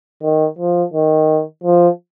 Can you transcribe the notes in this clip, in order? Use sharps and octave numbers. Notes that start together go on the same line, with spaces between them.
D#3
F3
D#3
F3